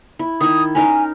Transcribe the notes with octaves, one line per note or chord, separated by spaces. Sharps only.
E4
D#3 E4 D#6
C#4 D#4 A#4 G#5